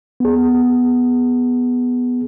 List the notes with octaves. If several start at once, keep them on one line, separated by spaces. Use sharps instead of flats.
B3 G#4